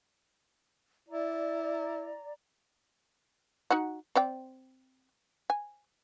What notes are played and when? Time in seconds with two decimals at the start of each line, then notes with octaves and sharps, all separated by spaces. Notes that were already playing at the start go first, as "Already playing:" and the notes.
1.08 E4 D5 A#5
3.70 D#4 F#4 F#5
4.15 C4 D5 G5
5.50 G#5